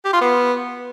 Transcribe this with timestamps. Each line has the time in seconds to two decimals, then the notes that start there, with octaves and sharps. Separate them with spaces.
0.05 G4
0.13 F4
0.21 B3